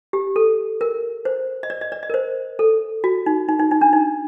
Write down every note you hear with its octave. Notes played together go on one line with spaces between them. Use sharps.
G4
A4
A#4
C5
D#5
D5
D#5
D5
D#5
A#4
C5
A4
F#4
D#4
D#4
D#4
D#4
D4
D#4